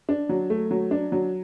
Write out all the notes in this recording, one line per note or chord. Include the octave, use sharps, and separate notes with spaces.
D4
F#3
A3
F#3
D4
F#3